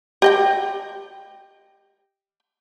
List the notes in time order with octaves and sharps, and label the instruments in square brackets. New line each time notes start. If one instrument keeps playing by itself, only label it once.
[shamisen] G4 D#5 G5